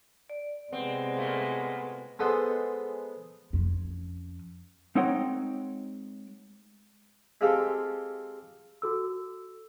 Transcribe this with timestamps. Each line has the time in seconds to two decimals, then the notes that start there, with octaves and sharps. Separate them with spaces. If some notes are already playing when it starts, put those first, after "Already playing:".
0.30 D5
0.73 C3 G#3 B3 C4
1.17 A#2 A3 A#3
2.19 G#3 B3 A4 C5 F#5
3.53 F2 C#4
4.95 G#3 C4 D#4 C#5 F#5 G5
7.41 G#3 C4 F4 G4 A4
8.82 F#4 A4 E6